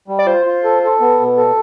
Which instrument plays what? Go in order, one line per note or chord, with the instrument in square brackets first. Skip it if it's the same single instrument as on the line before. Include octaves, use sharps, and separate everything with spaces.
[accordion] G3
[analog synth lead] D5
[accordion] F4 [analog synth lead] C5
[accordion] F4
A4
A4
B3
B2
A4